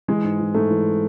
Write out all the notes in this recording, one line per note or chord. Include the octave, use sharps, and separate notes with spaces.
E3 G#3
G#2
E3
G#2 A3
E3